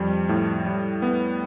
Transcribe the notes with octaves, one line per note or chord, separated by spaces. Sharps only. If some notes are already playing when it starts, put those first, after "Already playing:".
Already playing: F2 G3
A2
G3
B3